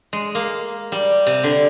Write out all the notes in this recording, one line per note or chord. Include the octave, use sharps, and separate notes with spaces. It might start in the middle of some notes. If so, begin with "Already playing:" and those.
G#3
A#3
G3
C3
D3